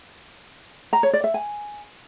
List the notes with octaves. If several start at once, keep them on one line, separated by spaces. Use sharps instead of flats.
A#5
C#5
D5
E5
G#5